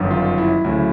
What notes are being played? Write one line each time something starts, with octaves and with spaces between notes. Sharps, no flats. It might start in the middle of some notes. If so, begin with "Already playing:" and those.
Already playing: G1 F#2 D#3 F#3
F4
E4
D2 C#3 F#3 E4